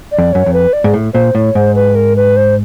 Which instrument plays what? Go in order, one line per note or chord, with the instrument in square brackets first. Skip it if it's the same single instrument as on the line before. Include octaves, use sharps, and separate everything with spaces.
[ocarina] D5
[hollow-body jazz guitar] F2
[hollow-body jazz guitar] F#2 [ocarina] C#5
[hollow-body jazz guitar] F2
[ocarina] B4
D5
[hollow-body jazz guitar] G#2
A2
[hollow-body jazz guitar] A#2 [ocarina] C5
[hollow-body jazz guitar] A2 [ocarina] C#5
[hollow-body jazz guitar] G#2 [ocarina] C5
[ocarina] B4
A#4
B4
C5